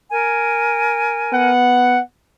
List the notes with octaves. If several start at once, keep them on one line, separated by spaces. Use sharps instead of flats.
A#4 G#5
B3 F#5